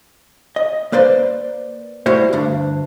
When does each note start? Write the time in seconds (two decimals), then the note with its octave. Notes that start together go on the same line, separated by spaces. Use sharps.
0.56 D#5
0.92 A#3 B4 C5 D5
2.06 G3 A3 E4 F#4 C5
2.33 D2 G2 D4